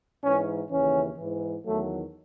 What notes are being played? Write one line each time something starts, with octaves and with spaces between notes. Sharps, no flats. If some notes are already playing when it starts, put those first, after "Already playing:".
G#2 E3 C#4
D#2 C#3 E3 C#4
G#2 E3
E2 D#3 F#3 A3